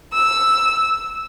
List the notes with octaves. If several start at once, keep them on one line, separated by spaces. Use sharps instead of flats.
E6